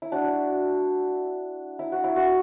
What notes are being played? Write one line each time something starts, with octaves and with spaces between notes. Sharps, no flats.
E4
D4 F#4
E4
F#4
E4
F#4